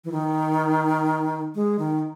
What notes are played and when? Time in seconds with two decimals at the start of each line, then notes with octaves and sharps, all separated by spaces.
0.04 E3
0.12 D#3
1.55 G#3
1.79 D#3